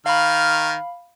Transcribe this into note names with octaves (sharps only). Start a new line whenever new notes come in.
D#3 F5 B5 F6